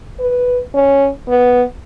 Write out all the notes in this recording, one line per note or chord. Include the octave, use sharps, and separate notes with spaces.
B4
C#4
B3